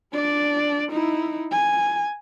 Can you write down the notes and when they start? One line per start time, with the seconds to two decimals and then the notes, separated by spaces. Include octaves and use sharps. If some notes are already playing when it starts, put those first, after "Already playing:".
0.13 D4 D5
0.91 D#4 E4
1.51 G#5